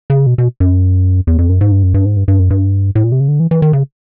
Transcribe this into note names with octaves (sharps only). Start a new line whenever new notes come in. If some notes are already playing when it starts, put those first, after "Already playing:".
C#3
B2
B2
F#2
E2
F2
F#2
G#2
G2
F#2
G2
G#2
G2
G2
F#2
G2
A2
A#2
C3
C#3
D3
E3
E3
D#3
C#3